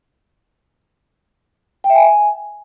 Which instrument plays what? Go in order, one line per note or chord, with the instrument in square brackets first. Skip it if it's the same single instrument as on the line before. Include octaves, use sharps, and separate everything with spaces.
[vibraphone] G5
E5
G#5